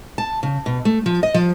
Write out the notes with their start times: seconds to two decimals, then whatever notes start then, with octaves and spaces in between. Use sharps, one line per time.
0.18 A5
0.43 C#3
0.66 B2
0.85 A3
1.06 F3
1.23 D#5
1.34 F3